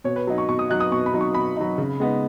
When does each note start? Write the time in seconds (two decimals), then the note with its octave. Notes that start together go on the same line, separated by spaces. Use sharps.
0.04 B2 C#5
0.16 B4
0.27 F#3 D#4
0.38 C#6
0.49 B2 C#6
0.59 D#6
0.70 F#3 D#4 F#6
0.80 D#6
0.91 B2 C#6
1.06 B5
1.14 F#3 D#4
1.21 C#6
1.34 B2 B5
1.57 F#3 D#4
1.78 C#3
2.00 G#3 B3 D#4